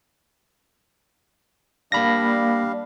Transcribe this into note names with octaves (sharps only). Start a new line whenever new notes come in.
G3 A#3 D4 F5 B5 A#6